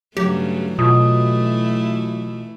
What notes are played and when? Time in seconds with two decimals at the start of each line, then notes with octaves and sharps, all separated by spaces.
0.17 G2 C#3 F#3 A3 G4
0.79 B2 E3 A3 E4 F4 D#6